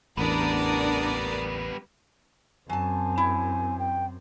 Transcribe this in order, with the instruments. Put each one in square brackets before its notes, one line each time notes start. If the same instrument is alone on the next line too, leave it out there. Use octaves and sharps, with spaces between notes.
[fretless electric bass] A1 E2 [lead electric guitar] G3 B3 [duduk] D4 [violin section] A#4 D5 D#6
[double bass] F#2 C4 [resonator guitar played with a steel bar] F#3 A5 [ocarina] G#5
[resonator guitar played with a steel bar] E4
[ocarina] G5